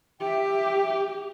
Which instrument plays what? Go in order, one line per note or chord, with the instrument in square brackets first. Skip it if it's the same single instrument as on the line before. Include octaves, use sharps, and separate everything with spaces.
[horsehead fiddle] G4 [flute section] E5 G5